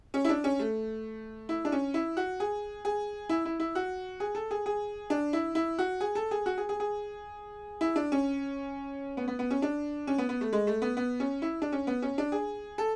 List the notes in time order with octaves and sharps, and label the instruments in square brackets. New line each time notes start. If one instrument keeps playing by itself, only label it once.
[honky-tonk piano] C#4
E4
D4
C#4
A3
E4
D4
C#4
E4
F#4
G#4
G#4
E4
E4
E4
F#4
G#4
A4
G#4
G#4
D4
E4
E4
F#4
G#4
A4
G#4
F#4
G#4
G#4
G#4
E4
D4
C#4
B3
B3
B3
C#4
D4
C#4
B3
B3
A3
G#3
A3
B3
B3
C#4
E4
D4
C#4
B3
C#4
D4
G#4
A4